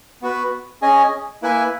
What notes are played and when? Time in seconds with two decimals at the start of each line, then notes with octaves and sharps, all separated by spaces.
0.22 B3 F#4 B4
0.82 C#4 G#4 D#5 G#5
1.42 A#3 E4 B4 E5 G#5